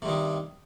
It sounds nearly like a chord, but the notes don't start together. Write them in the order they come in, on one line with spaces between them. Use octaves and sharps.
C3 G2 D#3